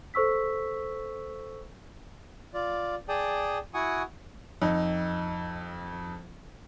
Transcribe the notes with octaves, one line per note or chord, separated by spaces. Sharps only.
A4 C5 C#6 E6 B6
F4 D5
G#4 D5 G5 A5 D#6
E4 F#4 F#5 G#5 C#6 D#6
F2 D#4